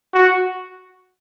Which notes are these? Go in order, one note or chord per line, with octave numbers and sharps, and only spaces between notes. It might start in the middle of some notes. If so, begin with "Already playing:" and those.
F#4